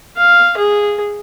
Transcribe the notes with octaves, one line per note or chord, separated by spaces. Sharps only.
F5
G#4